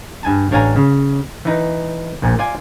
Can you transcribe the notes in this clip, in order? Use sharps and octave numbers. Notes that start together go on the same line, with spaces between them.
G2 G#5 A5
A1 D4 C#5 F5 G#5 A#5
C#3
E3 D#4
A#1 A#2
F4 D5 G#5